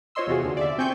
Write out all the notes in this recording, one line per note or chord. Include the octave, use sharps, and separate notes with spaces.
F4 C5 C#5 D#5 C6 E6
E2 C3 F4 F#4 G#4
D#2 D3
D5 E5
C4 G5 G#5 C#6 G6